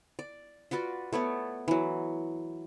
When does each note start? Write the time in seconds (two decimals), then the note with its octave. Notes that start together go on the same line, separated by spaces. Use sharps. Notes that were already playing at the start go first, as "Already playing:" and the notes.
0.19 D5
0.71 F4 F#4 B4 D5
1.13 A3 B3 C#5 D5
1.68 E3 F#3